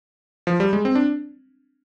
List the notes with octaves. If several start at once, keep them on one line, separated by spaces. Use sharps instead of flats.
F3
G3
G#3
C4
D4